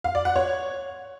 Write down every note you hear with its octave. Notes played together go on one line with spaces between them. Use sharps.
F5
D5
F#5
C#5